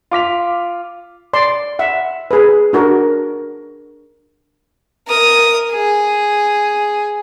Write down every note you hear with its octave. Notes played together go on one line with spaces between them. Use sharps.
F4 D6 B6 F7
D5 C6
E5 F#5
G#4 B4
D4 F#4 A#4
A#4 D#6
G#4